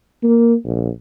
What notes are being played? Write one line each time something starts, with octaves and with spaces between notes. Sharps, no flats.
A#3
A#1